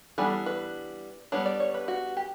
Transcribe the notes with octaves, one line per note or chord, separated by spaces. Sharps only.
E3 G3 B3 D4 A4
B4
G3 B3 D4 C#5
D5
C#5
B4
F#4
G4